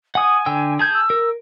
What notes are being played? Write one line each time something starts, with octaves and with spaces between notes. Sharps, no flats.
F#5 G#5 D#6
D3 G5 E6
G#4 A5 G6 G#6
E6
A#4